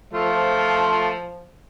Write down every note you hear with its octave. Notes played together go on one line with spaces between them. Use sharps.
F3 A3 F4